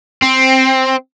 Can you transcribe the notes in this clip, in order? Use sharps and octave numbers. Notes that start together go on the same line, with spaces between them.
C4